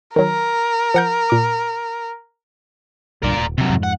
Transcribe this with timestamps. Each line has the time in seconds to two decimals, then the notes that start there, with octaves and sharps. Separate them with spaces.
0.16 D#3 F#3 A#4
0.94 F3 F#5 G6
1.30 A#2 D6
3.23 B1 G2 D3 A#4 D5
3.37 D#1
3.58 C3 F#3
3.69 F2 G#2
3.83 F#5